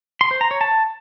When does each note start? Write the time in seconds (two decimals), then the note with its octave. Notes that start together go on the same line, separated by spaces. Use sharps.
0.21 C6
0.31 C5
0.41 A#5
0.51 C#5
0.61 A5